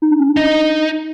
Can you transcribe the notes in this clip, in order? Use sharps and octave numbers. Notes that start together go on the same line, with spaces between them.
D#4
D4
C#4
D4
D#4